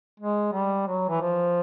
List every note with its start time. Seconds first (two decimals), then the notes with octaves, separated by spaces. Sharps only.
0.20 G#3
0.53 G3
0.87 F#3
1.09 E3
1.21 F3